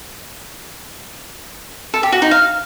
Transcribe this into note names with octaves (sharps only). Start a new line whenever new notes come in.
A4
G4
F#4
D#4
F5